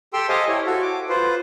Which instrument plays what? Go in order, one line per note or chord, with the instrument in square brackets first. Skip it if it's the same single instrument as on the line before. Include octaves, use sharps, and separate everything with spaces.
[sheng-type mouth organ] G4 A4 G5 C6 E6
G4 A4 C5 D#5 F5 G#5
E4 C#5
F#4 A4
D6
F4 B4 C5